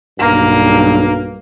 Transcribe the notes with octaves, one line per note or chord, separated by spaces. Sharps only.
B1 G2 A#3